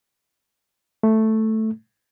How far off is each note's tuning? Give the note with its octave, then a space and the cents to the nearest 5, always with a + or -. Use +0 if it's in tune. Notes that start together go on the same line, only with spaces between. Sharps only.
A3 +0